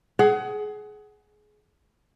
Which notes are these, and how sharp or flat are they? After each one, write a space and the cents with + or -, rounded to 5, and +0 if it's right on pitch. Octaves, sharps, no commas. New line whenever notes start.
G#4 +20 F#5 +25